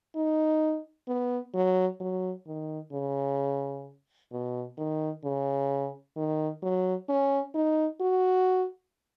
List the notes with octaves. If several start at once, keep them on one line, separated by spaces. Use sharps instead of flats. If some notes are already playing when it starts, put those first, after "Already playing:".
D#4
B3
F#3
F#3
D#3
C#3
B2
D#3
C#3
D#3
F#3
C#4
D#4
F#4